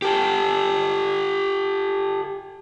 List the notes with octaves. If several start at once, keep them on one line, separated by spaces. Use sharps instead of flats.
G4 A4